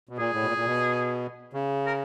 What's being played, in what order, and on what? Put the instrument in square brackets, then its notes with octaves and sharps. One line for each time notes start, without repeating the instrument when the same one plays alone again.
[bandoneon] B2
[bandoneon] A#2 [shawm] G#4
[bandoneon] A2
B2
A#2
A#2
B2
C#3
[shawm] A#4